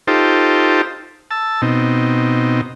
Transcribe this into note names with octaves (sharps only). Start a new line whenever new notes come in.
D#4 F4 G4 A4 C5
A5 E6
B2 C4 D#4